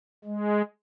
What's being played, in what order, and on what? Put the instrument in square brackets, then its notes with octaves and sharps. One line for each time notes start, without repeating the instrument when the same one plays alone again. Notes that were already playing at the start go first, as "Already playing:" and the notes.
[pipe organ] G#3